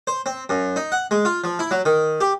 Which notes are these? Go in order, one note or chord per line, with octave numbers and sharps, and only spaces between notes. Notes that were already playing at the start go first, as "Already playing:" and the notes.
C5
C4
F#2
D#4
F#5
G#3
F4
F3
E4
F#3
D#3
G4